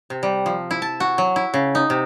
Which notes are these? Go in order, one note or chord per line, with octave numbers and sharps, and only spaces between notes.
C3
G3
F3
E4
A5
F#4
F#3
E4
C#3
D#4
C3